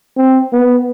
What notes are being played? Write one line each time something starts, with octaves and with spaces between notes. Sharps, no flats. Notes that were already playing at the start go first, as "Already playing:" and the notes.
C4
B3